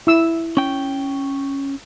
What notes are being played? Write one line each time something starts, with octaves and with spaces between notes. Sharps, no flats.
E4 E6
C#4 G5